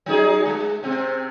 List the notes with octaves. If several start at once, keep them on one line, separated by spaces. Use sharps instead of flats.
F#3 D#4 G#4
G#3
C3 C4